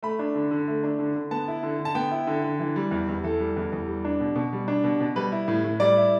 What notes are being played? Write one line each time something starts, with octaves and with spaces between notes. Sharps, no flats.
A3 B5
D4
D3
D3
A3
D4
D3
D3
B3 A5
E4
D3
D3
A5
B3 G5
E4
D3
D3
E3
G3
E2
E2
E3 A4
G3
E2
E2
G3
D4
B2
B2
G3
D4
B2
B2
G3 B4
E4
A2
A2
G3 D5
E4